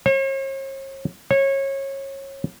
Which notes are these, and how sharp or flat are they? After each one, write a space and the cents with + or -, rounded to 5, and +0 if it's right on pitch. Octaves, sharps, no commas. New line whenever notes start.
C#5 -45
C#5 -25